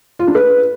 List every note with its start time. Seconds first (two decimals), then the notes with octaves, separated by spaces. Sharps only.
0.19 F4
0.27 D4
0.35 B4